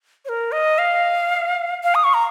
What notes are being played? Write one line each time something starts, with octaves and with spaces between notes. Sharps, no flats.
C#5
A#4
D#5
F5
F5
D#6
C#6
A#5